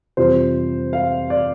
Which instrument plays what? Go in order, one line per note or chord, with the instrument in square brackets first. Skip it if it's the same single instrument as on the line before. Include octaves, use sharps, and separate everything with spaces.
[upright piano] F2 C3 E3 G3 C5
F5
D5